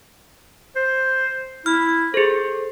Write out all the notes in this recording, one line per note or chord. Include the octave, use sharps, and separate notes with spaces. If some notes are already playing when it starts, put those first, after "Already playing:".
C5
E4 F6
G#4 A4 C5